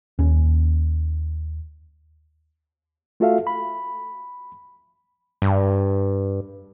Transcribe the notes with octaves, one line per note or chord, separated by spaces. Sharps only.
D#2 C#4
A3 F4 F#4 A4 E5 F5
B5
G2